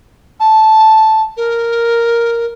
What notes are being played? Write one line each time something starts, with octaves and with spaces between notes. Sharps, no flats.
A5
A#4